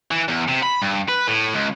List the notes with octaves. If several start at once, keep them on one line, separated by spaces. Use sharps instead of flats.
E3
E2
C3
B5
G2
B4
A2
C#2